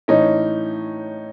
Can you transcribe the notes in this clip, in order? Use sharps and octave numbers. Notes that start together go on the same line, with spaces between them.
A2 E3 C#4 D#4